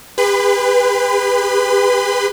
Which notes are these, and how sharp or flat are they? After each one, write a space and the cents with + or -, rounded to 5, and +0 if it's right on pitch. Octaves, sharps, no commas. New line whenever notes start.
G4 +45 B4 +0 B5 +45